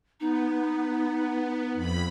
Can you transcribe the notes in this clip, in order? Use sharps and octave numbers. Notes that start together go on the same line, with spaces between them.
B3 D#4
F2 B5